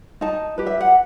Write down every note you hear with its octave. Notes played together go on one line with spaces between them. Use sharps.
D#4 A5
G4 B4
E5
F#5